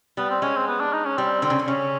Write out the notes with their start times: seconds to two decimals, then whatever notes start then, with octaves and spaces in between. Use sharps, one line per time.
0.17 G3 B3
0.30 C4
0.42 G#3 C#4
0.56 C4
0.68 B3
0.81 D4
0.93 D#4
1.05 C#4
1.17 G3 C4
1.42 D3
1.50 C#3
1.59 D3
1.67 C#3 C#4